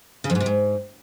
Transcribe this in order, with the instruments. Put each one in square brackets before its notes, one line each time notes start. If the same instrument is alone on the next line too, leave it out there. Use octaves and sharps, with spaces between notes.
[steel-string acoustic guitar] C#3
F2
G#2
C3
G#2